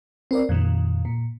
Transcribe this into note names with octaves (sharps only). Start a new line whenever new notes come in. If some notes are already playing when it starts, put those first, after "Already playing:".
C4 A#4 D5
F2 A#2 D#3
A#2